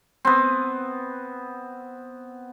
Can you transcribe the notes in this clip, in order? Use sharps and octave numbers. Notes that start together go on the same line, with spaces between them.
B3 C4